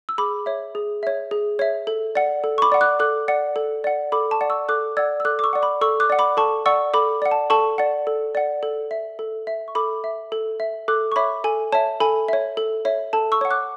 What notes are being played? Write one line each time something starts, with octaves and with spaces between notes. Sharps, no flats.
E6
G#4 B5 D6
C#5 E5
G#4
C#5 E5
G#4
C#5 E5
A4
D5 F#5
A4
C#6
B5 D6
D5 F#5
D6 F#6
A4 D6 F#6
D5 F#5
A4
D5 F#5
A4 B5 D6
A5 C#6
D5 F#5
C#6 E6
A4 D6 F#6
D5 F#5 E6 G#6
E6
A4 D6 F#6
D6
C#6 E6
D5 F#5
B5 D6
A4 C#6 E6
D6 F#6
D5 F#5
B5 D6
A4 A5 C#6
D5 F#5 C#6 E6
A4 B5 D6
D5 F#5
A5
A4 A5 C#6
D5 F#5
A4
D5 F#5
A4
E5
A4
E5
C#6
A4 B5 D6
E5
A4
E5
A4 D6 F#6
C#6
C#5 E5 B5 D6
A4 G#5
C#5 E5 A5
A4 G#5 B5
C#5 E5
A4
C#5 E5
A4 A5
C#6 E6
C#5 F#5
D6 F#6